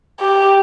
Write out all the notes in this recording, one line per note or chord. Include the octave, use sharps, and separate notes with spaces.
G4